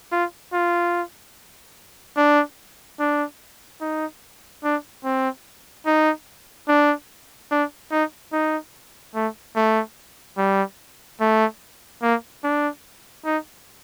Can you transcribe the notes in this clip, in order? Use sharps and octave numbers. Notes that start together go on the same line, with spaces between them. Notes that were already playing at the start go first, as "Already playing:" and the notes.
F4
F4
D4
D4
D#4
D4
C4
D#4
D4
D4
D#4
D#4
A3
A3
G3
A3
A#3
D4
D#4